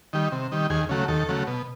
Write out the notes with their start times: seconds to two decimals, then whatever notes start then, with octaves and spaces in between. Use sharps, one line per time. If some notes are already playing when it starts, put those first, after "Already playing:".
0.13 D#3 G3
0.32 C3
0.51 D#3 G3
0.70 D#2 G#4
0.89 C#3 F#3 A3
1.08 D#2 A4
1.29 C#3 F#3 A3
1.47 B2